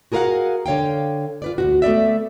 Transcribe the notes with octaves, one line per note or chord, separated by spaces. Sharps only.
F#4 G#4 A#4 B4 F5 F#5
D3 C#5 F5 G5
F4 B4 D5
D2 A#2 F#4
A3 B3 D5 E5